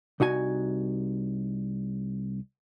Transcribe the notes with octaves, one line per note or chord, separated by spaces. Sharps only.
C2 D#4 F#4 G#5